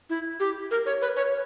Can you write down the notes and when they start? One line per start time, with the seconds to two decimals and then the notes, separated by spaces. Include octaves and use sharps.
0.10 E4
0.40 G4
0.71 A#4
0.86 C#5
1.02 B4
1.17 C#5